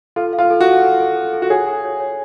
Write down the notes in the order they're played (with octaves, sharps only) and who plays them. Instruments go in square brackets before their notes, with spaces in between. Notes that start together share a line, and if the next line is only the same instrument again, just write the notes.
[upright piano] F4 [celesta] A4
[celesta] F5
[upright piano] F4
[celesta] A4
[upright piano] F#4
[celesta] F5
A4
A4
A4
A4
[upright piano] F#4
[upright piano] G#4 [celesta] C#5
[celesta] G#5
C#5
C#5